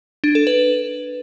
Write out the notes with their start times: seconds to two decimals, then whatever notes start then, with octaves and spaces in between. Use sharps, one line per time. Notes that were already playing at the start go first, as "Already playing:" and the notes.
0.24 D4
0.35 A4
0.47 B4